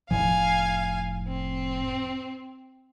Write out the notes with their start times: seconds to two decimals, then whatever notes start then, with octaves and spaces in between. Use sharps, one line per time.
0.11 F1 A2 F3 F5 G#5
1.28 C4